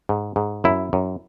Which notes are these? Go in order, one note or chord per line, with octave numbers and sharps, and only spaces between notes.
G#2
G#2
F#2 E4
F#2